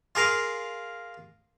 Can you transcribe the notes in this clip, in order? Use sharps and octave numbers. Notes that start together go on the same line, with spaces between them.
F4 G#4 A#4 F5